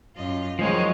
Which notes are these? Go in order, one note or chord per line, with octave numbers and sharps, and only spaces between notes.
F#2 F4 D#5
D#3 F3 F#3 G#3 C5 C#5 F5